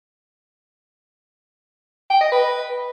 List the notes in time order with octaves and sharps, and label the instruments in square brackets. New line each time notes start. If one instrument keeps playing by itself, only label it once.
[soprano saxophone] G5
D#5
B4